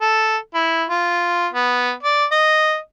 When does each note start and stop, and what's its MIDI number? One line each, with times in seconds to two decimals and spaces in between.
0.02 0.37 69
0.54 0.84 64
0.89 1.47 65
1.53 1.92 59
2.03 2.25 74
2.32 2.78 75